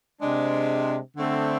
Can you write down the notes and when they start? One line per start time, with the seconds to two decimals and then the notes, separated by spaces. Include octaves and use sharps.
0.19 C3 G#3 D4
1.16 D3 A3 C4